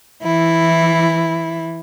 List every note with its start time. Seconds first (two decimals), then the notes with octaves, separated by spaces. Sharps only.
0.22 E3 E4